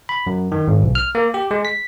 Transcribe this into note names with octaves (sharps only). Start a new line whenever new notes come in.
B5
F#2
D#3
G#1
B1
F6
A#3
G4
G#3
B6